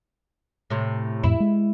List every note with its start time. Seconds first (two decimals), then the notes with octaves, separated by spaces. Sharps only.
0.70 A2 C3
1.24 F2 A2 E4
1.40 G#3